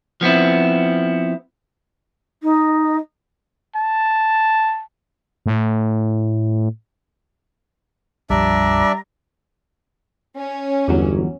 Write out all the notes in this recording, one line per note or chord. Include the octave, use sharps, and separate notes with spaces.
F3 B3 C4 E4
D#4
A5
A2
A#1 F2 F3 G3 D4 D5 E5 A#5
C#4
G1 E2 F#3